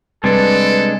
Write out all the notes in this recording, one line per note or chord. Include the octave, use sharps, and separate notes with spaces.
C3 G3 G#3 C4 D4 A4 B4